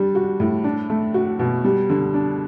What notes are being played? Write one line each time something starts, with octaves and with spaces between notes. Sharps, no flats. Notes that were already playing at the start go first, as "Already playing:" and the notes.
Already playing: G3 D4
F#4
A2
D4
A3
F#4
B2
G3
D3
D4